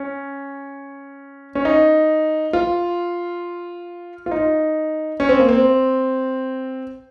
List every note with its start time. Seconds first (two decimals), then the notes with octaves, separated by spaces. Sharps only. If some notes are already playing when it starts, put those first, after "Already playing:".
Already playing: C#4
1.55 C#4
1.65 D#4
2.53 F4
4.26 F4
4.31 D#4
5.20 C#4
5.29 C4
5.39 A#3
5.49 C4